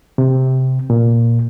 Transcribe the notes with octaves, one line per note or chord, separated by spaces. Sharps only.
C3
A#2